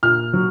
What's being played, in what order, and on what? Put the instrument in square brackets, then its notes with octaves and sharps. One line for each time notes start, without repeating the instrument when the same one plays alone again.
[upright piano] A#2 F6
F#3